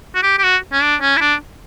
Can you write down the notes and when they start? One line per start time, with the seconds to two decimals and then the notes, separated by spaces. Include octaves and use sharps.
0.15 F#4
0.23 G4
0.39 G4
0.43 F#4
0.73 C#4
0.82 D4
1.01 C#4
1.17 E4
1.21 D4